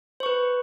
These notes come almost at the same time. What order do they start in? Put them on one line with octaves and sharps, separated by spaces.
C5 C#6 B4